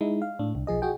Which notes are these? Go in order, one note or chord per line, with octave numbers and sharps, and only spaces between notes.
G#3 D#4 E4
F5
A2 D4
C2
B1 F3 G#4 D#5
F#4 G#4 G5